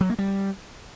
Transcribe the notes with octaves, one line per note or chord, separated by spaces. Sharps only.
F#3
A#3
G3